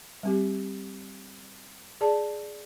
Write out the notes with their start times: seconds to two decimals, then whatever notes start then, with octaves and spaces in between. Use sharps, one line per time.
0.23 G3 C4 G4
2.01 G#4 D5 A5